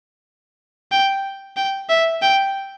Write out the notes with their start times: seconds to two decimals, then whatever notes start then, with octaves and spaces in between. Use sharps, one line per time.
0.92 G5
1.57 G5
1.90 E5
2.22 G5